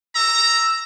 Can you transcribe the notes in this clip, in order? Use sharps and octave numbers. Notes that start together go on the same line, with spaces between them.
A#5 E6